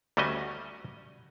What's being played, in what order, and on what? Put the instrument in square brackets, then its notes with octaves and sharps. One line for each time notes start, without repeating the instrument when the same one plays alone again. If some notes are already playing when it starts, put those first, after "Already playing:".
[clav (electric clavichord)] D2 G3 A3 C#4 F#4 D#5